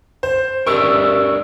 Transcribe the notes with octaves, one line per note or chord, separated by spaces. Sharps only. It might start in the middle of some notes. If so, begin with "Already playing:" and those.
C5
D4 G4 A#4 C#6 E6